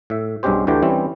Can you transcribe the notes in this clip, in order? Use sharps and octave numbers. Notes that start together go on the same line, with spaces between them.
A2 E5
B1 G2 G#3 C#4 G4 C5
D2 D3 E3 G4 G5
E3 G3 C4 C#4